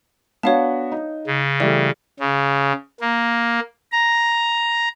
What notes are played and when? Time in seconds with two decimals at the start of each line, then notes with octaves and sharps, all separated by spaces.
0.43 B3 D4 F#4 C#5 F5 A5
0.92 D#4
1.27 C#3
1.60 E3 G3 A3 D5
2.20 C#3
3.01 A#3
3.92 A#5